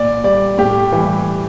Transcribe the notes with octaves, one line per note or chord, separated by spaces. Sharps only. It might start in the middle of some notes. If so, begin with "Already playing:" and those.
Already playing: A#2 D5
G3 D5
A2 G4
E3 G3